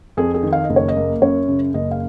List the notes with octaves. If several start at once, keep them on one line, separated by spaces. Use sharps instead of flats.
F2 G#4
G#4
D#3
F5
D#5
F#1
C#5
D#5
A#3
F#2 C#5
C#3
F#1 D#5
F5